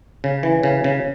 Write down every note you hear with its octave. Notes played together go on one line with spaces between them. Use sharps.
C#3
E3
C#3
C#3